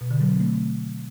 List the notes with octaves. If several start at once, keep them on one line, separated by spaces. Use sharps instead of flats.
B2
D3
F#3
C4
A3